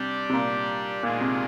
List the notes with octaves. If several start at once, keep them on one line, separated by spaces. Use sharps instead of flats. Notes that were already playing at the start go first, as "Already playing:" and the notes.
Already playing: C3 G3 D4 G4 D5
C3
A#2
A#2 D#3 G#3 D4 F4 G#4
C3